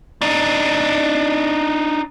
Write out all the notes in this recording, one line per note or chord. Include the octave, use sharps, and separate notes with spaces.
D4 D#4